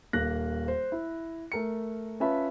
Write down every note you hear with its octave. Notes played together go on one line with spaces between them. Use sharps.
D#1 A#3 F#6 A#6
C5
E4
A3 A#4 C#7
C#4 F4 B4 E5 A5 B5